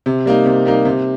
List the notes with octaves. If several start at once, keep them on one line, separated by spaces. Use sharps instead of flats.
C3
G3 A#3 D#4
C3
G3 A#3 D#4
C3